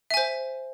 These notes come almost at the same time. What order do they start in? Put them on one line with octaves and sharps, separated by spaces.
E5 G#5 C5